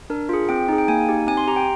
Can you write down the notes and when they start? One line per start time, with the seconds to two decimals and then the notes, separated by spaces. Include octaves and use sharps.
0.10 D4 A#4
0.29 F4 G#4
0.49 C4 G5
0.68 D#4 G#4
0.78 G5
0.88 A#3 G#5
1.08 D#4 G4
1.27 C4 G#5
1.37 C6
1.47 G4 A#5
1.56 G5